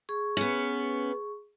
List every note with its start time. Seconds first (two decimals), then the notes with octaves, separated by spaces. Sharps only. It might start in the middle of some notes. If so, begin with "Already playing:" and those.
0.09 G#4 C#6
0.37 B3 C#4